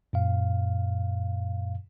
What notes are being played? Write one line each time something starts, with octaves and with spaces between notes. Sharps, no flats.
F#2 A#2 F5